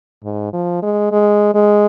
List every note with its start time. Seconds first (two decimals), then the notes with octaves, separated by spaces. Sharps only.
0.24 G#2
0.53 F3
0.83 G#3
1.12 G#3
1.54 G#3